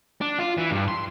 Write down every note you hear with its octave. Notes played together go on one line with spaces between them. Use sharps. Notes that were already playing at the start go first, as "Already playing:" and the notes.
D4
F4
E3
G2
C6